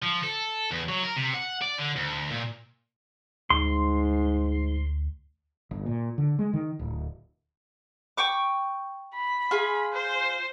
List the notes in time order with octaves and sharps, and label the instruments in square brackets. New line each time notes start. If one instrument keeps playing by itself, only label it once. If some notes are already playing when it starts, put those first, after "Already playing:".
[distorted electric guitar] F3
A4
E2
F#3
A#4
C3
F#5
D5
D3
D2
A#2
[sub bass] D2 [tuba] G#2 [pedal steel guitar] C6
[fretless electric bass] G1
A#2
D3
G#3
D#3
D1
[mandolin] G5 C#6 D6
[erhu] B5
[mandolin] F4 G#4
[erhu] C5